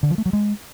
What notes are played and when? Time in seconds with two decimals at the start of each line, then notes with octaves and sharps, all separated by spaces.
0.03 D3
0.10 F3
0.18 A3
0.26 F#3
0.33 G#3